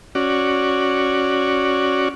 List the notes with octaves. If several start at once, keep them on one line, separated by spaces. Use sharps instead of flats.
C#4 F#4 D5